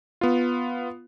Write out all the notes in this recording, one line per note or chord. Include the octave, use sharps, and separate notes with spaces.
B3 F4